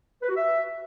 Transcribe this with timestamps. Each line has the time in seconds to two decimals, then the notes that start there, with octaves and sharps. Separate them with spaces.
0.22 B4
0.29 F#4
0.36 E5